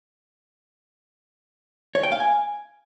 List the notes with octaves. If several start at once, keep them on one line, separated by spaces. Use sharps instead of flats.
C#5
G5
F5
G#5